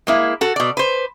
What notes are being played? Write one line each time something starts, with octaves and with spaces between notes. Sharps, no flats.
G#3 A#3 E4
F#4 A4
B2 D5
B4 C5